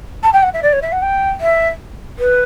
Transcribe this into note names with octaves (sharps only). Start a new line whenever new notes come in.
A5
G5
F#5
E5
D5
C#5
E5
F#5
G5
E5
B4